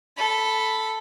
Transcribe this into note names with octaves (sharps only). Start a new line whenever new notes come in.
A4 B5